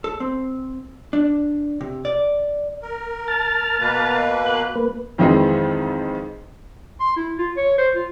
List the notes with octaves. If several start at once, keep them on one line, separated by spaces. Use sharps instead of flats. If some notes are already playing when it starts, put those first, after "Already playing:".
A4
C4
D4
C3
D5
A#4
A5 F6 A6
B2 A#3 B4
F#6
A#3 B4
F2 D#3 E3 G#3 C4 D#4
C6
E4
F4
C#5
C5
F4